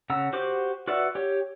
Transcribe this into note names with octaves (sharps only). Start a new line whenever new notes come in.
C#3 F#5 A#5 E6
F#4 G4 C5 D6
F#4 B4 D5 E5 F#5
G4 C#5